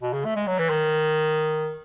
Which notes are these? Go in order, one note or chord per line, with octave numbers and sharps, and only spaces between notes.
B2
C#3
A3
G#3
F#3
E3
D#3